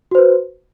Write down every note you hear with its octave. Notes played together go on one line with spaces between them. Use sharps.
F#4 B4 C5